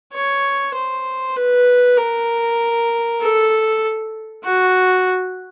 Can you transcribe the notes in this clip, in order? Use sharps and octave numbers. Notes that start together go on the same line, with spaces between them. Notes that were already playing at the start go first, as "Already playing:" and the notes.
C#5
C5
B4
A#4
A4
F#4